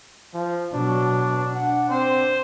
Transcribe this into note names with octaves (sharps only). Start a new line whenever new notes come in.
F3
B2 F#3 D4
D4 F#5
C4 C5